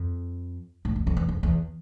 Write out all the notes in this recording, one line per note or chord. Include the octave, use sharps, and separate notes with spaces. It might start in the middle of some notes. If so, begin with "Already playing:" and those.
Already playing: F2
A2
F2
F2
E2
F2
E2